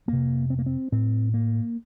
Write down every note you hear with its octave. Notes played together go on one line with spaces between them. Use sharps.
F2 C3 A#3
C4
A#3
C4
A2 C4
A#3